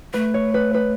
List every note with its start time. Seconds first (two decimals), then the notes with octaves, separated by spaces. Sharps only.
0.13 A3 B4
0.34 C#5
0.54 B4
0.74 B4